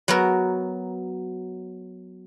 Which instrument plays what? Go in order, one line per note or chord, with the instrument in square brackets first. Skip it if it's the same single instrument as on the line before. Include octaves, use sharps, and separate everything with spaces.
[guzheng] F#3 B3 A#4